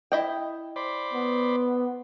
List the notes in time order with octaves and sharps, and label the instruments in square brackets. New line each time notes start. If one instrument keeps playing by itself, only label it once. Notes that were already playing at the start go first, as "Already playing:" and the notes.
[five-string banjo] E4 D#5 G5
[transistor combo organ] C5 D5 B5
[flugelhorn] B3